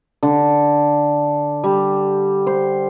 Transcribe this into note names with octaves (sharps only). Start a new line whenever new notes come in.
D3
G3
C5